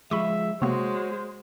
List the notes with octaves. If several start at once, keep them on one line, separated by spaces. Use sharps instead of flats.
F3 G#3 E5 B5 C#6
C3 G#3 A#3 B3 F#4 C5 C#5